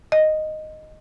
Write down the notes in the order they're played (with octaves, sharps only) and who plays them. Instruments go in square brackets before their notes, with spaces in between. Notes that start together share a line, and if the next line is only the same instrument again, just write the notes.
[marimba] D#5